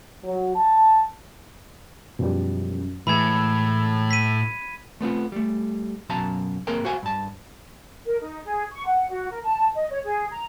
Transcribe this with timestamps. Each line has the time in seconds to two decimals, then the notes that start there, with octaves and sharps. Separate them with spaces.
0.24 F#3
0.55 A5
2.19 F#2 B2 F3 G3
3.07 A2 E3 G#3 B5 E6 G#6
4.11 B6 D#7
5.01 A3 B3 C4 F4
5.32 G3 A3
6.09 F#2 B2 F#3 F5 A5 A#5
6.67 G#2 A#3 C4 G#4 A#4 G5
6.85 F#4 C5 F5 G#5
7.03 G2 A5
8.05 A#4
8.20 D#4
8.45 G#4
8.72 C#6
8.85 F#5
9.09 F#4
9.29 A#4
9.42 A5
9.75 D#5
9.90 C#5
10.03 G#4
10.29 A#5